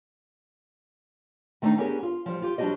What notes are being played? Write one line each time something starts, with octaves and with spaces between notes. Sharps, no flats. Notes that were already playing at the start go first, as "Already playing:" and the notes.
D#3 A3 A#3 D4 D#4
B3 C#4 D4 G4 G#4 A#4
F4
F3 G3
F4 G4
F3 G3 D4 F#4 G4 D#5